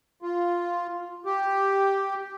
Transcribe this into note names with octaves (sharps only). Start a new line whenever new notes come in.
F4
G4